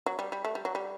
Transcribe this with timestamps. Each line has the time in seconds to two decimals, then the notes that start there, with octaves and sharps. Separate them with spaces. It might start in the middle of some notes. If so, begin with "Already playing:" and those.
0.06 F#3
0.19 G3
0.32 G3
0.45 A3
0.55 G3
0.65 F#3
0.75 G3